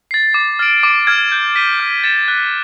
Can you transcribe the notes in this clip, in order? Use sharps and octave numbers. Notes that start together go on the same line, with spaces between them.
A6 C7
D6
F6 A6 D7 F#7
D6
F6 G#6
G6
B6 D#7 G7
F6
A6 C#7 E7
F#6